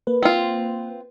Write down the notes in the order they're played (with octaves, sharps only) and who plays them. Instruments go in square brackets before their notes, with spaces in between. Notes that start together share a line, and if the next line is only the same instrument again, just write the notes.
[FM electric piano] A#3 B4
[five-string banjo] C4 F4